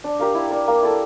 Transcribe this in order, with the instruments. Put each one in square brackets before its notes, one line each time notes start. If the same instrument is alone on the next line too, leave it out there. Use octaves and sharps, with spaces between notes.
[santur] D4
G4 A#4 F5
E4
A#4 D5
A#3
E4 A4